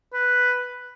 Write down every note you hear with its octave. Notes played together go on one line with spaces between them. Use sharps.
B4